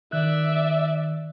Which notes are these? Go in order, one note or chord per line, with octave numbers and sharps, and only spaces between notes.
D#3 D5 E5 F#6